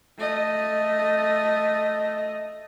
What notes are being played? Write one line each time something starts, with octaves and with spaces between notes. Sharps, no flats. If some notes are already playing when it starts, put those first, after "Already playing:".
A3 D#5